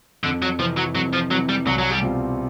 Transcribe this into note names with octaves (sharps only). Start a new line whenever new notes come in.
F2 D3
F#3
C3 E3 F3
F#3
F2 F#3
F3
C3 E3 F#3
G3
C2 F#3
F#3
G3
B2 G3 C4 F4